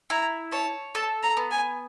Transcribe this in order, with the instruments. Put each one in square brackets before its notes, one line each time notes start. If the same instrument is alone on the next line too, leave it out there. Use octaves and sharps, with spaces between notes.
[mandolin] E4 [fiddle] A#5
[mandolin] C#5 [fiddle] A5
[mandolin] A4 [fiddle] A5
[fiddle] A#5
[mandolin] B3
[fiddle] G#5